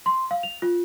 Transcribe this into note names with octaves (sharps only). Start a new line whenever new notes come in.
C6
F5
F7
F4